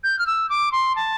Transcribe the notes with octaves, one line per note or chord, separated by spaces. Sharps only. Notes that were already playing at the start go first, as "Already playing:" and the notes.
G6
F6
E6
D6
C6
A5